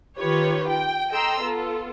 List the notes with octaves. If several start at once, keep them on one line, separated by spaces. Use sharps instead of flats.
D#3 F4 G4 B4 C#5
G5
A4 D#5 G5 A#5 C6 E6
B3 F4 A4